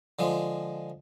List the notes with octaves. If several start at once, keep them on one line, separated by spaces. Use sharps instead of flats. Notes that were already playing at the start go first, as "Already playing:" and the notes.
D3 F3 G#3